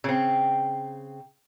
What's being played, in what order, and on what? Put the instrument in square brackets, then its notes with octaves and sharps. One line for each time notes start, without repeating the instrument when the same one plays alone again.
[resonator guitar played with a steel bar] C#3 C4